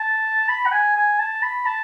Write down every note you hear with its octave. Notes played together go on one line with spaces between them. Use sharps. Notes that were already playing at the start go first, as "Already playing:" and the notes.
Already playing: A5
B5
F#5
G#5
G#5
A5
B5
A5